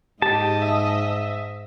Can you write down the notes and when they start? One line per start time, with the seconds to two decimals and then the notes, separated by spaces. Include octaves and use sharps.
0.22 G#2 G4 D#5 A5
0.62 E5